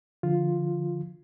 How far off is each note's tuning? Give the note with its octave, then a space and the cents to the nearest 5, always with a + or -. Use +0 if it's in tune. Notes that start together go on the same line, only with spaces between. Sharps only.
D3 -5 F3 -10 F4 +0